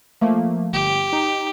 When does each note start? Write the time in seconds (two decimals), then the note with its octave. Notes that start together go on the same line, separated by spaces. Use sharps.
0.21 F3 A3 A#3
0.73 G1 G4
1.13 D#4